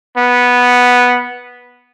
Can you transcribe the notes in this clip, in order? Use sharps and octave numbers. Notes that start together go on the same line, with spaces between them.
B3